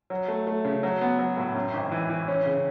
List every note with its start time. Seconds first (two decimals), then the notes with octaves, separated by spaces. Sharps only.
0.10 F#3
0.28 A3
0.47 A3
0.65 C#3
0.83 F#3
1.01 B3
1.19 F#3
1.37 A2
1.55 F#2
1.74 G#1
1.91 E3
2.10 E3
2.28 C#4
2.46 C#3